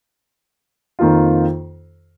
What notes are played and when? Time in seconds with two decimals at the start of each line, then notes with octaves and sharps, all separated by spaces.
0.99 F2 D#3 A#3 F4